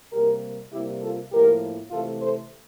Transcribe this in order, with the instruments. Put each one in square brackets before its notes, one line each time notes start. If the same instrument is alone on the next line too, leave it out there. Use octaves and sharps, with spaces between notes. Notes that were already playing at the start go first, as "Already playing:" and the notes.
[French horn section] C3 G3 A#3 G4 A#4
C3 G3 A#3 E4 G4
F4 A4
A2 F3 A#3 G4 A#4
C3 E3 A3 F4 A4
A4 C5